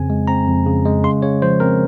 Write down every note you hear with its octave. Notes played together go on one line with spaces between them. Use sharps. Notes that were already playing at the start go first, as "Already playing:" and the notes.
Already playing: F2 C#3 C4 G#5
G#3
C4 A#5
F2
C#3
G#3
C#3 C6
C#3 C#5
F3 C5
C4 A#4